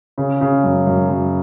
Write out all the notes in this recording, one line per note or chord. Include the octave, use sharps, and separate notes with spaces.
C#3
C#3
F#2
F#2
F#2